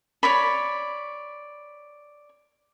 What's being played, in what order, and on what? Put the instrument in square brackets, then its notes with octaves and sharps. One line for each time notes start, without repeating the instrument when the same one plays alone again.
[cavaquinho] C#5 D5 B5